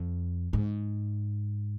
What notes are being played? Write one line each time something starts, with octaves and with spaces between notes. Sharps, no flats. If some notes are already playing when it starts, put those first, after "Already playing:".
Already playing: F2
G#2